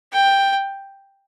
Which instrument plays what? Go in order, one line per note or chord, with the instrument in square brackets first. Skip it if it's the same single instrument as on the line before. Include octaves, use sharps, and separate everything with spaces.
[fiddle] G5